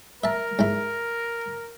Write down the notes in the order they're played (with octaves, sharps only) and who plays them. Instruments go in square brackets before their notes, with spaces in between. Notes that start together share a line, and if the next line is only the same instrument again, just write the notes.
[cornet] A#4 [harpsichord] E5 A5
[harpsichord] G#2 E4